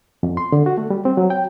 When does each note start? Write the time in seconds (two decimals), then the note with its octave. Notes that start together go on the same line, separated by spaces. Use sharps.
0.23 F2
0.37 C6
0.52 D3
0.66 F#4
0.78 A3
0.90 G3
1.05 C4
1.17 F#3
1.30 G5